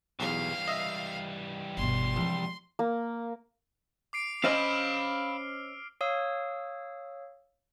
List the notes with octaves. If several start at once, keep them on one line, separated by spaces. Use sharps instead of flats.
B1 E2 E3 G3 F5
D#5 E5
G1 B2 C6
C2 F3 G#3
A#3
D6 C7 D7
C#4 C5 D#5 F5 B5 E6 F6
C#5 F5 D#6 E6